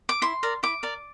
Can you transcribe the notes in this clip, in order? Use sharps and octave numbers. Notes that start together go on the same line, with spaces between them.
D6
E4 C6
A#4 D5
E4 D6
A#4 D5